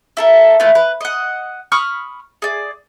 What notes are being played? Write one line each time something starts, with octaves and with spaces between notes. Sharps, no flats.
E4 A4 A#4
A3 E4 F4 B4
B4
D#5 F#5
B5 C#6 D#6 F6
G#4 D5